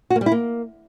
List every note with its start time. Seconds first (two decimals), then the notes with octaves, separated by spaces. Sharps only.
0.10 F#4
0.16 A#3
0.21 G3
0.26 E4
0.32 A#3